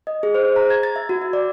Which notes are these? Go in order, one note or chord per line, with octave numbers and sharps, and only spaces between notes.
D#5
G#4
C5
A#5
G#6
A6
E5
F#4
E5
D5